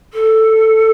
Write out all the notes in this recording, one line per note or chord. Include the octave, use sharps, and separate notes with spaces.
A4